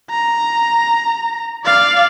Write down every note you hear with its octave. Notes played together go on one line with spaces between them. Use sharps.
A#5
D5 F5